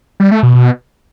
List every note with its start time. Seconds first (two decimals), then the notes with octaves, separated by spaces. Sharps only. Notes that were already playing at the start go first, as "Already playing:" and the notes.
0.20 G3
0.31 A3
0.43 B2
0.54 B2